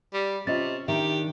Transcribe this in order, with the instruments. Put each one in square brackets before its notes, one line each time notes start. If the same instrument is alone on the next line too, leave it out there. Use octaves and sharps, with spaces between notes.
[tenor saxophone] G3
[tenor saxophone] C3 [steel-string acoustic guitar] C#4 [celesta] F4 D#5 A6
[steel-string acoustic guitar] D#3 D4 [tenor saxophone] G4 [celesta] E5